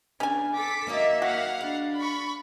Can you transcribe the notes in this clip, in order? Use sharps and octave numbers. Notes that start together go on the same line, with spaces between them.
C#3 B3 C#4 D4 G#4 G#5
A4 D6 B6
D#3 F#3 A#3 D#5 E5
F#4 F5 F#5
C#3 D4
B5 C#6